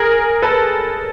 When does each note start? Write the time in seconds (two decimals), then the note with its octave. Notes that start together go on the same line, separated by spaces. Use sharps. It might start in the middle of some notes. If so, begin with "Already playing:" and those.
Already playing: G#4 A#4
0.42 A4 B4